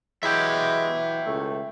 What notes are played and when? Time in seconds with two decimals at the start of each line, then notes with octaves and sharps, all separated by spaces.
0.23 E3 F#3 G#3 E4 G4 E5 G5
1.26 C#2 A3